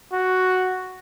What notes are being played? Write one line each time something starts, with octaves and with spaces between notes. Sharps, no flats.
F#4